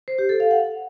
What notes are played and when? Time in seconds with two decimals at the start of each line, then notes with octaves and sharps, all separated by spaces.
0.08 C5
0.19 G4
0.29 A4
0.40 F5
0.51 F#5